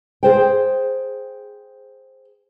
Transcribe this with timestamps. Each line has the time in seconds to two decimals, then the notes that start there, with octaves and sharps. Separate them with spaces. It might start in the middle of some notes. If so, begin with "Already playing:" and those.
0.23 G#4 C5 G5